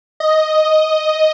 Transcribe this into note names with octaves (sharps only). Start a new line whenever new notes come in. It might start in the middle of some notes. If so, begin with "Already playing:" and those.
D#5